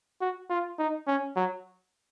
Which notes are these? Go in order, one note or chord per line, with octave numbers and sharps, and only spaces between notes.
F#4
F4
D#4
C#4
F#3